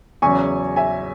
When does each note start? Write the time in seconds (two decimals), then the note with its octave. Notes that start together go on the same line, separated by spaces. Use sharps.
0.22 E2 C#3 F#3 G#5 C#6
0.76 E5 G#5